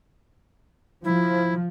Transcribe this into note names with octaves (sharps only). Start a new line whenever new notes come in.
F3 E4